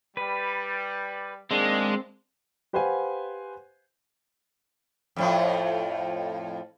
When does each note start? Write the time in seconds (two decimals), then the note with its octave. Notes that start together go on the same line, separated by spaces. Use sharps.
0.17 G3 B4
1.51 D#3 G#3 A#3 C4 D4
2.73 G4 B4 C5 F5 F#5 G#5
5.16 F2 A2 F3